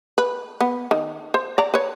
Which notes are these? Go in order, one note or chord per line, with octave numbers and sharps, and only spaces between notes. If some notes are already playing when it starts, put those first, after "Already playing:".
B4
B3
D#3
C5
D5 A#5
B4 C#5